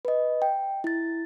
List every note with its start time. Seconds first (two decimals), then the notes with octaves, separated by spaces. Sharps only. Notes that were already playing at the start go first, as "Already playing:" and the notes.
0.05 B4 D#5
0.42 G5
0.84 E4 A6